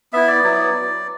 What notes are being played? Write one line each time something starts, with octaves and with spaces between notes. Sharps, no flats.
B3 E4 E5
D5
F#3 B3 E4